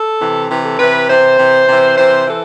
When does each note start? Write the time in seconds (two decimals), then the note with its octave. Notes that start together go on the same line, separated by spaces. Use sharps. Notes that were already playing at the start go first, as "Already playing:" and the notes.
Already playing: A4
0.20 C3 E3
0.50 C3 E3
0.64 A4
0.79 C3 E3 B4
1.09 C3 E3 C5
1.39 C3 E3
1.68 C3 E3
1.97 C3 E3 C5
2.27 E3 A4